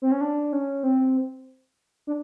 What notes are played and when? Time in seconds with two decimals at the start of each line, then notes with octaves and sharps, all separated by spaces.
0.02 C4
0.11 C#4
0.21 D4
0.53 C#4
0.83 C4
2.07 D4